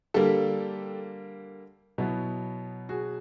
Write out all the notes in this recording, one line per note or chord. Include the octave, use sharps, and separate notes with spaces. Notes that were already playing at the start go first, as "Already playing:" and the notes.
D3 G3 A#3 G4 A4
B2 F#3 B3 E4
F#4 G#4